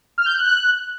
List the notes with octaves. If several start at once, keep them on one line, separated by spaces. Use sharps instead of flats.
F6
G6
F#6